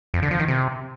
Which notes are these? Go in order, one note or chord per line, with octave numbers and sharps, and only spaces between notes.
F2
D3
F3
D#3
C3